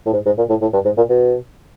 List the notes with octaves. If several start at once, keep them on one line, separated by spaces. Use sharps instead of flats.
A2
G#2
G#2
A#2
A2
A2
G2
G#2
A#2
B2